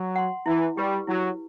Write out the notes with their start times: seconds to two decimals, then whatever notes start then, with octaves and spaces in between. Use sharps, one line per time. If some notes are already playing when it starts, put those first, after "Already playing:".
Already playing: F#3
0.16 F#5 C6
0.46 E3 E4
0.77 G3 G4 B4
1.07 F#3 E4